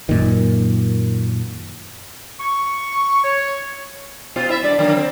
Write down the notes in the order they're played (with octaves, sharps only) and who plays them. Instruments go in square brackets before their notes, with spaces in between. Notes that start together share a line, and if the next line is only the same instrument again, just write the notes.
[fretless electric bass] F#2 A#2 D#3
[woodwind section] C#6
C#5
[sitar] B2 F4 C5
E4 E5
G2 D5
D3 F#3 A#3
C4